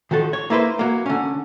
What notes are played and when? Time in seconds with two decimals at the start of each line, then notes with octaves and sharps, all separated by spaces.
0.11 D#3 F3 F#4 A4
0.33 C#5
0.50 A#3 E4 B4 C5
0.79 F#3 A#3
1.06 D3 C#4